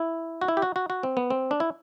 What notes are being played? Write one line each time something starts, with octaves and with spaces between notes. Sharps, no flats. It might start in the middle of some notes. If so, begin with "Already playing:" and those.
Already playing: E4
F#4
E4
G4
F#4
F#4
F#4
C4
B3
C4
D4
E4